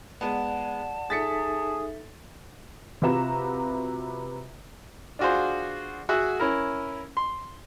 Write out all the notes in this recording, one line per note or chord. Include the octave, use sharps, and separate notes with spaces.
G#3 B3 D5 F#5 A5
D#4 G#4 A4 E5 A6 B6 C#7
C3 F4 F#4 B4 A#5 E7
D4 F4 F#4 G#4 C5
F#4 G#4 E5 F#5
C#4 E4 A#4
C6